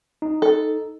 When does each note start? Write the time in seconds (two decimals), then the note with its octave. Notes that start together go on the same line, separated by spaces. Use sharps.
0.22 D#4
0.42 A4